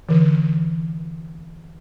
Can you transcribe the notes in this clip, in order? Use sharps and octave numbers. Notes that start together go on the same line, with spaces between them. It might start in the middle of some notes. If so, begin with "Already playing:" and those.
D3 E3